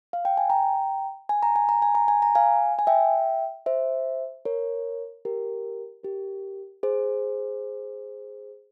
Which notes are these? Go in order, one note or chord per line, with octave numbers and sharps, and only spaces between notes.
F5
G5
G#5
G5 A#5
G#5
A#5
G#5
A#5
G#5
A#5
G#5
A#5
F5 G#5
G#5
E5 G5
C5 E5
A#4 C#5
G4 A#4
G4 A#4
G#4 C5